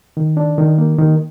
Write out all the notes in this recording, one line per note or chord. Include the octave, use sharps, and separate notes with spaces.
D#3
D4
D#3
A#3
D#3